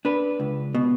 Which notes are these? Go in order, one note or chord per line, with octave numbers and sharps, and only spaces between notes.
D4 B4
C#2
B2